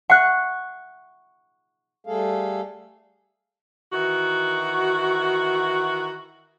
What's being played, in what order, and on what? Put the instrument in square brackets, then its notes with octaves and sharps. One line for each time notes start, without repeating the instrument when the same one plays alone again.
[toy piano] E5 F#5 [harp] C#6 F#6
[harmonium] G3 A3 G#4 A4 F5
[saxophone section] D#3 E3 F#4